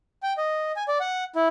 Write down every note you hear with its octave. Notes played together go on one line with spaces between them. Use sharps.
G5
D#5
G#5
D5
F#5
E4